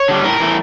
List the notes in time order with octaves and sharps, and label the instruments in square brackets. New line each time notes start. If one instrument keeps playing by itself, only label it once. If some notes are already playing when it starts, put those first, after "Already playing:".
Already playing: [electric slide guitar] C#5
D3 G3
A2 A#4
E3 A3